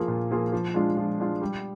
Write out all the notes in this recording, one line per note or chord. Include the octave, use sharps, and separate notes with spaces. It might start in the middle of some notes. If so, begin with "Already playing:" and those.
Already playing: F3 A#3 F4 G#4
A#2
F3 A#3 F4 G#4
F3
G#3 D4 F4
F3
G#3 D4 F4
G3